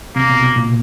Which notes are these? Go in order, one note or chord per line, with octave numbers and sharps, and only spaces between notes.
C3 A#3
B2
B2
A#2